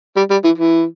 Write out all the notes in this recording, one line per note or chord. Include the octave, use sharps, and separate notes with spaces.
G3
G3
E3
E3